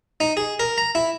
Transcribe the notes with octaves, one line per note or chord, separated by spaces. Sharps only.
D#4
G#4
A#4
A#5
E4